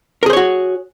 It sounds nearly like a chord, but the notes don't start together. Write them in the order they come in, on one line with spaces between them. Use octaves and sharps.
A#4 G#4 C5 C#5 F#4